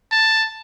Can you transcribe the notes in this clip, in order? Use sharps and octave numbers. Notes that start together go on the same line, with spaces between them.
A5